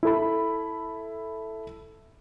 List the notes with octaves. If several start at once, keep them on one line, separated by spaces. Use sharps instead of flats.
E4 A4 B5